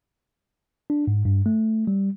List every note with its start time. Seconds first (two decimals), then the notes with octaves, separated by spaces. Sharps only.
0.90 D4
1.07 G#2
1.25 G2
1.46 A3
1.87 G3